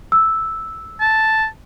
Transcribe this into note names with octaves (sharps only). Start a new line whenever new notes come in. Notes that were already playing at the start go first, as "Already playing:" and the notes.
E6
A5